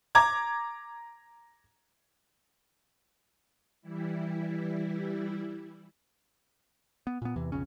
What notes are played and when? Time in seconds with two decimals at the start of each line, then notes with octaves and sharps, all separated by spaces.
0.15 A#5 D6 G#6
3.81 E3 G3 E4
7.07 B3
7.22 A#2 B3
7.36 E2 C3 E3
7.52 B1 F2 C#3 C#4